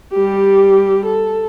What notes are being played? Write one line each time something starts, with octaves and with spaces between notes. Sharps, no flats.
G3 G4
A4